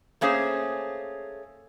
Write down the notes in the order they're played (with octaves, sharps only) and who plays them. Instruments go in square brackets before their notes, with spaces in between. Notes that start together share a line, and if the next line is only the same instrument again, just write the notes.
[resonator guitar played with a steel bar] A3 A#3 C#4 G#4 C5